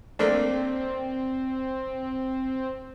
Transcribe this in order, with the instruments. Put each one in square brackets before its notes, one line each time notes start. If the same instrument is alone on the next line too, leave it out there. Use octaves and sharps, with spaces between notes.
[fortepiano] A3 A#3 D4 [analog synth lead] C4